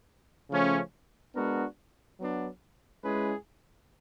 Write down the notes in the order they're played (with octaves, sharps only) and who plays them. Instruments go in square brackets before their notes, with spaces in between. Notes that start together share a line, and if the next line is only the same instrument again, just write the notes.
[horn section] C#3 F3 A3 C#4
G#3 B3 D4 F#4 A#4
F#3 B3 D4
G#3 C#4 E4 G#4 B4